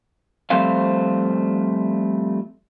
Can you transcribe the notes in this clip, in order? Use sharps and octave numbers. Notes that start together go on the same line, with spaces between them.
F3 G3 A3 C4 C5 F5